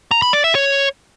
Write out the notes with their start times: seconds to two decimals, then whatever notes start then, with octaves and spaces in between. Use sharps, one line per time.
0.11 A#5
0.22 B5
0.33 D5
0.44 E5
0.55 C#5